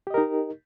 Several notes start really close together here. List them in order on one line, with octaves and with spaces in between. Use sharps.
G4 D#5 A#4 D#4